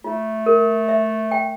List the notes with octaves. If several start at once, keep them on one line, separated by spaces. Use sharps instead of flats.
A3 F4
A#4
E5
G5